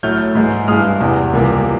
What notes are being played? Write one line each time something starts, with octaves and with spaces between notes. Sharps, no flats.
A2 F#3 A3 F6 G6
G#2 E3 G#3
G2 E3 G#3 D#6 F6
E2 C3 E3
C#2 C3 E3 G3 A#3